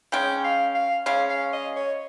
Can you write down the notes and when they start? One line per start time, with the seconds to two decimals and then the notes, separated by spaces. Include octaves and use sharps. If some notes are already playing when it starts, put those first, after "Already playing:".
0.12 C#3 G#3 C#4 G5
0.44 F5
0.75 F5
1.06 C#3 G#3 C#4 F5
1.30 F5
1.53 D#5
1.76 C#5